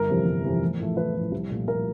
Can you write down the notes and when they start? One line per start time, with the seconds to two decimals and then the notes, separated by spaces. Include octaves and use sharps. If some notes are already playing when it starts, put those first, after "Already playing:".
Already playing: G1 A#4
0.08 F2 C3 E3
0.25 G1
0.44 F2 C3 E3
0.61 A1
0.80 A2 F3 A3
0.97 A1 B4
1.15 A2 F3 A3
1.32 C2
1.51 A#2 F3 A3
1.68 C2 A#4